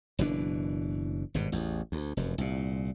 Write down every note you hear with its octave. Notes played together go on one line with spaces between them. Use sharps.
F#1 B2 E3 D4
G#1 G2 B2
A1 E2
D2
F1 F#2
C2 A#2